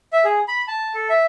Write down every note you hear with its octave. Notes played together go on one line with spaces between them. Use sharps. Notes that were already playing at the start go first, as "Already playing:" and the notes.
E5
G#4
B5
A5
A4
E5